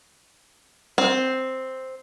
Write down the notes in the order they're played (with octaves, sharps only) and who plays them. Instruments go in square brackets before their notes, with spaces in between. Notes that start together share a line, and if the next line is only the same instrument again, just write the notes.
[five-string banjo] C4